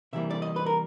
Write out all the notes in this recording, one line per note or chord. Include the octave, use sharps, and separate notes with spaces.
C3 E3 G3 A#3 E5
D5
D#5
B4
A#4